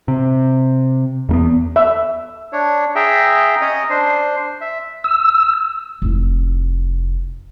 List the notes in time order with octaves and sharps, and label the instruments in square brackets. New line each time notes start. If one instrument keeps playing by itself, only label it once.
[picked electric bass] C3
E2 A#3 B3
[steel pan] E5
[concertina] D4 C#5
G#4 E5 G5 A#5
C#4 C#5 D#5 A#5
D4 C5
E5
[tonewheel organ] E6
[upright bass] F1 E4